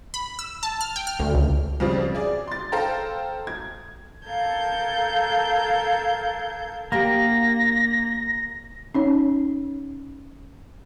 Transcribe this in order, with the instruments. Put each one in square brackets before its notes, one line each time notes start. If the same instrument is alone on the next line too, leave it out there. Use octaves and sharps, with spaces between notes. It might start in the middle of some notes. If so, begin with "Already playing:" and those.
[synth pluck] B5
E6
A5
F6
G5
F6
D2
C#2
[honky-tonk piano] F2 C#3 F3 G3 C4
G#4 D5
C6 A6
A4 C5 F5 G5 A#5
G#6
[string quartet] A4 A#4 F5 A5 G6 G#6
[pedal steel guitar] A#3 [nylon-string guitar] D4 F#4 G4 [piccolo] A#6
[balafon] C#4 D#4 C#5